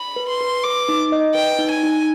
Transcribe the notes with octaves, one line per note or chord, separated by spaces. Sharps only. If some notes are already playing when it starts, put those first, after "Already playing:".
Already playing: B5
B4
C6
B4
B4 D6
D#4
D#5
B4 G5
D#4
G#5
D#4